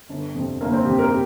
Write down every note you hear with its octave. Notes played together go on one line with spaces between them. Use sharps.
G1
F2 C3
G1 A#3
C4
F2 C3 G4
A#4
G4